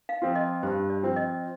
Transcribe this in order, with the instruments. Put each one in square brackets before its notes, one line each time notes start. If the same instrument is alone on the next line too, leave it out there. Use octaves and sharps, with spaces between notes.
[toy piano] F5
[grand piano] F3 C4 F4
[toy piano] D#5
[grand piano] G2 [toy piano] C5
[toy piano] D5
[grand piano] F3 C4 F4
[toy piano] D#5